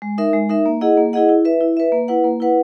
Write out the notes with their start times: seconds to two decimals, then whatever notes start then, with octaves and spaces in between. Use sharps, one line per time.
0.02 G#3
0.18 D#4 A#4 E5
0.33 G#3
0.49 D#4 A#4 E5
0.66 A#3
0.81 E4 G#4 D#5 F#5
0.97 A#3
1.13 E4 G#4 D#5 F#5
1.29 E4
1.45 B4 E5
1.61 E4
1.77 B4 E5
1.92 A#3
2.08 E4 B4 F#5
2.24 A#3
2.40 E4 B4 F#5